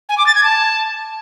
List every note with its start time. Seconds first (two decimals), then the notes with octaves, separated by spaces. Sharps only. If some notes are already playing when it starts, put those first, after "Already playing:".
0.09 G#5
0.18 D6
0.26 A6
0.35 G#6
0.44 A5